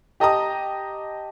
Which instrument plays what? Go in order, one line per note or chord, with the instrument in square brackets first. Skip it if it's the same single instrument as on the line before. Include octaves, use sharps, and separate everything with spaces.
[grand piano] G4 D#5 A5 A#5 D#6